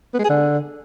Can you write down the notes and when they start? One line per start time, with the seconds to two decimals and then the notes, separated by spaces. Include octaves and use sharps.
0.14 B3
0.19 G#3
0.24 G#4
0.30 D3